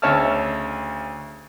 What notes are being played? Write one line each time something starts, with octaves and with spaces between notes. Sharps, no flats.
D2 C#3 C#5 E5 A5 F6